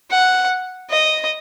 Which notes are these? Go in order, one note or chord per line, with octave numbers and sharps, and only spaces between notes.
F#5
D#5